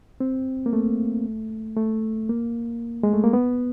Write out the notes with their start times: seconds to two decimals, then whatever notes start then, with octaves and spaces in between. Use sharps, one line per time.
0.20 C4
0.66 A#3
0.73 A3
1.77 A3
2.29 A#3
3.03 G#3
3.14 A3
3.24 A#3
3.33 B3